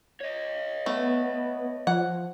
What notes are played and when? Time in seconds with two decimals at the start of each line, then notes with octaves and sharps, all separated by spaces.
0.21 C#5 D#5
0.86 A3 B3
1.87 F3 F#5